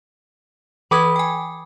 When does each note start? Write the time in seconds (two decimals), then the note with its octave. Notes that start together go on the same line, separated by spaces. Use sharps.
0.91 E3 B4 B5 D6 D#6 G#6
1.16 G5 G#5